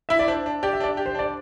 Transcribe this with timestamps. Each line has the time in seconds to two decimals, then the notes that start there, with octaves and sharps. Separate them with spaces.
0.09 E4 E5
0.19 D5
0.28 D4 C5
0.46 D4
0.63 G4 D5
0.73 E5
0.80 D4 D5
0.97 G4
1.06 C5
1.15 D4 D5